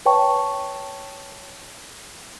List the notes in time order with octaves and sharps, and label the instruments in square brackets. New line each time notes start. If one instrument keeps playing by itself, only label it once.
[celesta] B4 C#5 G5 A5 C#6